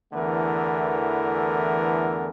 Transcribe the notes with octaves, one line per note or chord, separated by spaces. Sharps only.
E2 D3 E3 A3 B3 A#4